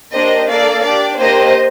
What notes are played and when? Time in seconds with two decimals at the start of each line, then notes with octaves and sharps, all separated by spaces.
0.12 A#3 D4 G4 C5 D#5
0.48 A#3 D4 A4 D5 F5
0.83 D4 G4 D5
1.19 A#3 D4 G4 C5 D#5